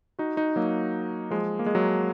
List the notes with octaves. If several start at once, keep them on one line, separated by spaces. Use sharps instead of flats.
D#4 F#4
D#4 F#4
F#3 A#3
F3 G#3
A#3
G#3
F#3 A#3